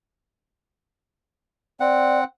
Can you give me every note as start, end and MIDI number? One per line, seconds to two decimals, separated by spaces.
1.80 2.24 60
1.80 2.19 74
1.80 2.24 78